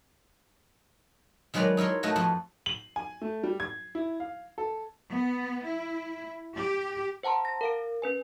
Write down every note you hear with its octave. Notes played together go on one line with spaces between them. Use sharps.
D#3 F#3 G#3 B4 D5 A#5
D#4 E4 A#4 C#5 C6
A3 D#4 F#4 D#5
F2 A3 B3 D#4
F#7
G#5
A3
G3
G#6
E4
F5
A4
B3
E4
G4
C5 F#5 A5 A#5 C6
A#6
A#4 F5 D7
C#4 B4 G#5